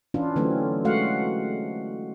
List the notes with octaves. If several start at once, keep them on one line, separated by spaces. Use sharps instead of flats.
E3 C#4 D4 E4 F4
D3 E3 F#3 A3 C4 C#4
G#3 A3 F#4 F5 F#5